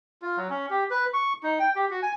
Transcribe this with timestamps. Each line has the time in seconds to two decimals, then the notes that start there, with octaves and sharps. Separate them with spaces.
0.22 F4
0.37 F#3
0.50 C#4
0.70 G4
0.91 B4
1.14 C#6
1.43 D#4
1.59 G5
1.76 G4
1.90 F#4
2.03 G#5